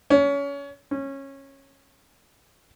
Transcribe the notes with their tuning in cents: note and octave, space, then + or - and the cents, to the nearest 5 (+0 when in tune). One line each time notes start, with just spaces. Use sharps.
C#4 +25
C#4 -20